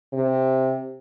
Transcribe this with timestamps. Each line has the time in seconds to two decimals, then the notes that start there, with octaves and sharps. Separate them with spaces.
0.13 C3